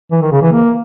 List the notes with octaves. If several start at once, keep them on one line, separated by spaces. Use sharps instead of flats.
E3
D#3
C#3
E3
A#3